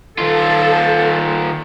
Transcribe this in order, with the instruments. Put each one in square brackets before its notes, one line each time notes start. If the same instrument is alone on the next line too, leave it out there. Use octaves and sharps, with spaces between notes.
[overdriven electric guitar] D#3 F4 [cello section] A4